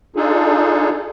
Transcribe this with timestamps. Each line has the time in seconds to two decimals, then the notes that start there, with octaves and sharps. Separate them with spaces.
0.16 D4 D#4 F4 G#4 A4